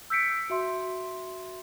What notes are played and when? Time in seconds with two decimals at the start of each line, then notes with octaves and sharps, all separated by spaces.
0.10 E6 G6 B6 C#7 D7
0.50 F#4 E5 C6